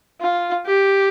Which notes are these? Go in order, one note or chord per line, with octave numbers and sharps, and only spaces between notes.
F4
G4